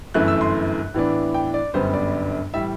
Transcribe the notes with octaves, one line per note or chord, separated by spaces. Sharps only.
G1 F#2 E3 A3 E4 F#6
E6
C6
A2 E3 B3 D4
G5
D5
G1 F#2 D3 G3 B3 C5
D5
A2 E3 G3 E5